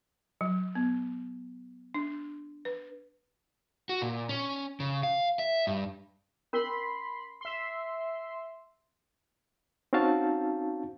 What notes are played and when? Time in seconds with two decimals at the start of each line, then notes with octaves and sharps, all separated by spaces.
0.41 F#3
0.75 B3
1.94 D4
2.65 B4
3.89 F#4
4.02 A#2
4.29 C#4
4.80 C#3
5.03 F5
5.39 E5
5.67 G2
6.53 C#4 A#4 B5 C6
7.41 E5 C6
9.93 C4 C#4 D#4 F#4 F5 A5